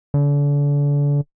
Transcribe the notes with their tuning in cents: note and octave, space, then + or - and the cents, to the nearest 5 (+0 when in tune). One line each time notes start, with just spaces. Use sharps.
D3 -35